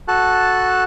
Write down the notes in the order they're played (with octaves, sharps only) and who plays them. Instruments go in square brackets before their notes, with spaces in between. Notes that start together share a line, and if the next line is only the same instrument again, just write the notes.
[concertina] F#4 A4 A5 F#6